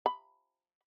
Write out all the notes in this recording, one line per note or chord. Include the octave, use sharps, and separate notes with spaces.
B5